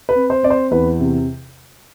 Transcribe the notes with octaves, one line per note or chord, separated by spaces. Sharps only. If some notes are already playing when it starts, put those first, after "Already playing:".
B4
C4
C5
C4 D5
C5
E2 B4
C3